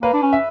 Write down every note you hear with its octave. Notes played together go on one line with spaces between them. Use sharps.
A#3 B4
D4
C#4
E5